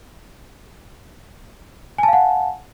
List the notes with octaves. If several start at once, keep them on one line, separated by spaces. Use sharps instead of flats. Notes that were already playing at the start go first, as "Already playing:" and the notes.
F5 F#5 G#5 A5